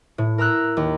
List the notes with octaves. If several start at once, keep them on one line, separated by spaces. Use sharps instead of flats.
A2
A#4 A#5 E6 F#6
D#2